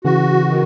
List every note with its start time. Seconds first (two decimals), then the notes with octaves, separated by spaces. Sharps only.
0.04 C#3 E3 F#4
0.49 D#3